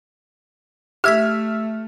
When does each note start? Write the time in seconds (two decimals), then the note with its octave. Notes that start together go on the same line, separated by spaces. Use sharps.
1.04 A3 G4 E5 E6 F6 G#6 B6